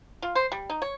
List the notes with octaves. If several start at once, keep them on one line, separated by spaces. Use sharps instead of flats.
F4
C5
G3
D#4
C#5